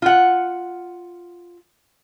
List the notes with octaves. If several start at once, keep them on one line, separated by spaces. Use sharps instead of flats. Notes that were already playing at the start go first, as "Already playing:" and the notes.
F4 F#5